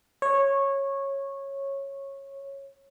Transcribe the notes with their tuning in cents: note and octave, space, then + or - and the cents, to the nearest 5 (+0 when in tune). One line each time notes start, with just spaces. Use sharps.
C#5 -15